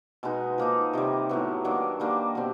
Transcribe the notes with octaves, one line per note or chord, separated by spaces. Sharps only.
B2 G#3 B3 D#4
F3 A#3 D#4
C3 D#3 G3
A2 F#3 B3
D#3 F#3 A#3 D4
D#3 G3 A#3 D4
B2 G3 C4